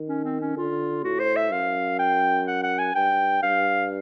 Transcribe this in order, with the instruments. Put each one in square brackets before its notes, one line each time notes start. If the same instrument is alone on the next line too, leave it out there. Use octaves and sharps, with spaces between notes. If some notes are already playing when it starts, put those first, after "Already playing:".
Already playing: [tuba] D#3
[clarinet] C#4
C4
C#4
[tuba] D3 [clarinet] F4
[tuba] A2 [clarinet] F#4
[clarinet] C5
E5
[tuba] F#2 [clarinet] F5
[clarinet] G5
F#5
F#5
G#5
[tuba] G2 [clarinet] G5
[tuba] G2 [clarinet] F5